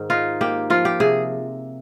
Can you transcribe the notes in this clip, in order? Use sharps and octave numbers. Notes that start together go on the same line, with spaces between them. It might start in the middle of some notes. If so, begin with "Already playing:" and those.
Already playing: G#2 D#3
D#4 F4
A#3 G4
F3 F4
G4
C3 G#4